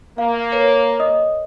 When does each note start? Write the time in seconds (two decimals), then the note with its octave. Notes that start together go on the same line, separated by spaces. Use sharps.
0.18 A#3 F5
0.52 A#4 B4 C#5
1.00 D#5 D#6